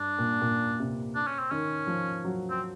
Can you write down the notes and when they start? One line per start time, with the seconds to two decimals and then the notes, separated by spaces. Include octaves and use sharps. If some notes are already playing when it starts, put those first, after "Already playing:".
Already playing: G2 D4
0.19 A#2
0.42 A#2
0.79 C3
1.15 D4
1.27 C#4
1.39 C4
1.51 D#3 C#4
1.87 F3
2.25 F#3
2.50 C4